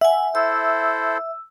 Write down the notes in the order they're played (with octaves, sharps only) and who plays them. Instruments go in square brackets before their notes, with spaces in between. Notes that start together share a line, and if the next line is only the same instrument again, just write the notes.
[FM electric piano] E5 [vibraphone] F#5 G#5
[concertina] E4 A4 C5 [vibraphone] E6